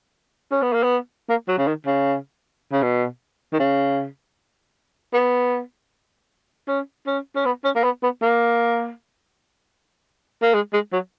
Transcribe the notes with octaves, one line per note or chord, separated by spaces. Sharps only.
C#4
B3
A#3
B3
A#3
F#3
C#3
D#3
C#3
C#3
B2
D#3
C#3
B3
C#4
C#4
C#4
B3
C#4
A#3
B3
B3
A#3
A#3
G#3
G#3
F#3